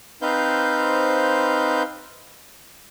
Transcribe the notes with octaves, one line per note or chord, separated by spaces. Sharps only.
C4 D#4 B4 C5 F5 G6